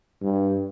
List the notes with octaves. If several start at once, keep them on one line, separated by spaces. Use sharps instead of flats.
G2